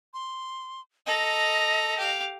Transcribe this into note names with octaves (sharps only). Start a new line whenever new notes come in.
C6
A4 D#5 A#5
G4 F5